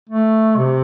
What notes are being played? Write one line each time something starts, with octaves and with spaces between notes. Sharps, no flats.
A3
C3